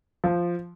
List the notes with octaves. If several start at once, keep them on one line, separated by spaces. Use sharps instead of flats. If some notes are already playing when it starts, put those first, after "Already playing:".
F3